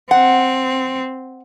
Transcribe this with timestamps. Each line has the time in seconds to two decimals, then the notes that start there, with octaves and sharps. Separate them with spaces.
0.11 C4 F#5